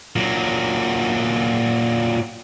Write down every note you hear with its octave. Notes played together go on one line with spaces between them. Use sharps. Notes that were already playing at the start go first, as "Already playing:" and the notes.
A#2 F#3